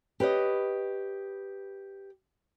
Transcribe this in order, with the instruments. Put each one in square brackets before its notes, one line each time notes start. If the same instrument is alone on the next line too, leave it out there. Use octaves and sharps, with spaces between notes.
[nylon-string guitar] G4 B4 C#5 D#5